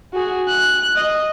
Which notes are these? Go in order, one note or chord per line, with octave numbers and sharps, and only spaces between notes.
F#4 G#4
F#6
D#5